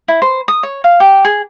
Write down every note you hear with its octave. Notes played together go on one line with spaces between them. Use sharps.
E4
C5
D#6
C#5
F5
G4
G#4